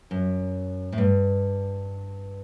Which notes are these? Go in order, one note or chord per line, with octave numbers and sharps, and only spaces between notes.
F#2
A2
G2